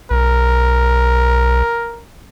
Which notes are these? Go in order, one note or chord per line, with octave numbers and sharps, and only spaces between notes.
B1 A#4